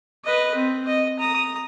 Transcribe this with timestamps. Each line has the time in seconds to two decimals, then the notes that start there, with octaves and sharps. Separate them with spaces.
0.24 B4 D#5
0.54 C4
0.87 D#5
1.19 A#5 D#6